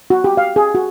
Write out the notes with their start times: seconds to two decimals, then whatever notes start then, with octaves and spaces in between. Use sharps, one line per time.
0.10 F#4
0.24 G4
0.37 F5
0.56 G#4
0.75 F#4